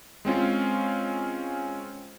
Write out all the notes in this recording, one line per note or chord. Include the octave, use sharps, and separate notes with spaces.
G#3 C4 C#4 F4